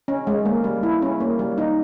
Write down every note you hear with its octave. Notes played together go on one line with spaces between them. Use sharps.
C#4
G#3
A#3
G3
E4
C#4
A#3
G3
D#4